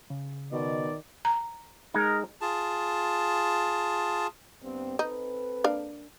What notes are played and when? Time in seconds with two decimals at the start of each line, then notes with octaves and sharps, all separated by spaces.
0.10 C#3
0.52 B2 D#3 D5
1.25 A#5
1.94 G#3 D#4 A#4
2.41 F4 G#4 A5
4.63 G2 B3 C4
4.99 C4 D#4 A4 B4
5.64 A#3 D4 F5